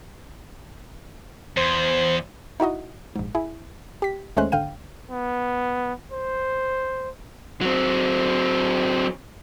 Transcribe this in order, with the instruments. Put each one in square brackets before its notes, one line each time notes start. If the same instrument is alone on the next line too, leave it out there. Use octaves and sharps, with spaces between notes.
[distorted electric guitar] E2 [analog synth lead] C5
[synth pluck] D#4 E4 F#4 D#5
A#1 G#2
E4 G#4
G4 B6
D#2 G#3 A3 C#4 C5 F#6
G#1 D3 F5 G5 D#7
[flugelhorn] B3
C5
[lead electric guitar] F#3 C4